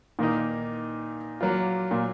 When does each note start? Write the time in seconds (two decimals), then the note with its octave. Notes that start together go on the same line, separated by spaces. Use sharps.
0.19 A#2 D#3 A#3 D#4
1.41 F#3 A#3 F4
1.91 A#2